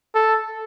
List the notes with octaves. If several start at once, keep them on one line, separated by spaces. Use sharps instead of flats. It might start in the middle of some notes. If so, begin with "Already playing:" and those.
A4